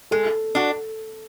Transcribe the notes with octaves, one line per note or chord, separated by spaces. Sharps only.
G#3 A4
D4 F#4